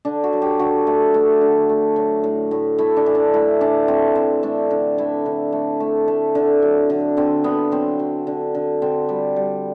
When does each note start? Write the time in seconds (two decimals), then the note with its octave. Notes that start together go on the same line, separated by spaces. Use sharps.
0.05 D3 D4
0.24 F#4
0.33 F#3
0.42 G4
0.59 D3 F#4
0.87 A3
1.14 A3
1.41 D3
1.69 A3
1.96 F#3
2.24 A2
2.51 A2
2.78 A3 E4
2.97 D4
3.06 E3
3.15 D4
3.34 A3 E4
3.61 E3 D4
3.88 A3 C4
4.16 E3 C4
4.43 A3 D4
4.71 D3
4.98 A3 E4
5.26 D3
5.53 A3
5.80 A3
6.08 A3
6.35 D3
6.62 F#3
6.90 D3
7.17 D3 C4
7.44 D3 B3
7.72 F#3 C4
7.99 F#3
8.27 D3
8.55 D3
8.82 D3 C4
9.09 G3
9.36 G3